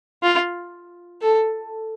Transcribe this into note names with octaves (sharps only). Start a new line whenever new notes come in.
F4
A4